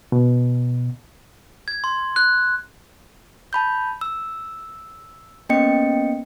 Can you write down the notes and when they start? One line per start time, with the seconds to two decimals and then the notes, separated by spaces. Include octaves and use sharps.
0.12 B2
1.68 G#6
1.84 C6
2.16 F#6
3.53 A5 B5 G6
4.01 E6
5.49 A#3 B3 C#4 D#5 G5 C#7